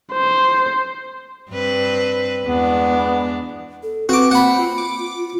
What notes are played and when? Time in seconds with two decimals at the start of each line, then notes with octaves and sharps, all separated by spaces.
0.13 C5
1.51 G2 C4 B4
2.45 E2 G#3 B3 D4
3.83 A4
4.09 C4 F#4 B4 D6
4.31 A#3 F#5 B5
4.58 F4
4.78 D6